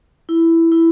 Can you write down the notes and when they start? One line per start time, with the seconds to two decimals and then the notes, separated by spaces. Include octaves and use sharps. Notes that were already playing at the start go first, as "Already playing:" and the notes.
0.29 E4
0.72 E4